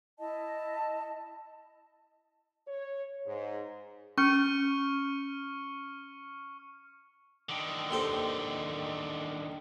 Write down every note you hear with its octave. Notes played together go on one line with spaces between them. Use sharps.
E4 D#5 A5
C#5
G#2
C#4 C#6 F6 C#7
D3 D#3
D#2 A4 C5